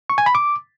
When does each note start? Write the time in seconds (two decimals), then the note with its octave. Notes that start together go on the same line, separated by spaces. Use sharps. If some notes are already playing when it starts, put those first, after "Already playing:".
0.10 C#6
0.18 G#5
0.26 B5
0.35 D6